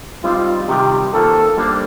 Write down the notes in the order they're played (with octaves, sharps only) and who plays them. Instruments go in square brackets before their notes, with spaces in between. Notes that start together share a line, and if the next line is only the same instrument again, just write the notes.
[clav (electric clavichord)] G3 C4 D#4 [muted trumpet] F4
[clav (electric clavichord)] C3 D#3 G3 [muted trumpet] G4
[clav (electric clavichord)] D#3 A#3 F4 C5 [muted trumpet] A4
[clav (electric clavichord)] G3 A#3 D4 A4 C5